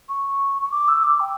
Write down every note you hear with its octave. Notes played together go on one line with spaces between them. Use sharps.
C#6
C#6
D6
E6
D6
G5